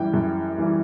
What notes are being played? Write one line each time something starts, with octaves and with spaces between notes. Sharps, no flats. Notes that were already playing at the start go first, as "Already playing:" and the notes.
Already playing: F#2 E3 G3 G5
F#2
E3 G3